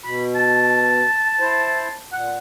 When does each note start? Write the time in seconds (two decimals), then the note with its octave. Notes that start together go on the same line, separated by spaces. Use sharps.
0.05 B2 B5
0.35 A5
1.40 E4 C5
2.13 A#2 F#5